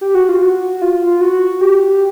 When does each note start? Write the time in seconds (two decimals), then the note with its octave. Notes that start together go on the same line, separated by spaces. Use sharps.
0.01 G4
0.15 F#4
0.29 F4
0.42 F#4
0.82 F4
1.21 F#4
1.61 G4